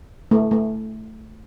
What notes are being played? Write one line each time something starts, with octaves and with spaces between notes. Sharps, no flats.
A3
A3